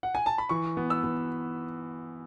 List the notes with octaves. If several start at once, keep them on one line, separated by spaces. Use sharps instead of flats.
F#5
G#5
A5
B5
E3 C#6
B3
E6
B3